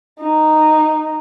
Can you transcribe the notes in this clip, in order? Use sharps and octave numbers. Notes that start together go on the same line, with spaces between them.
D#4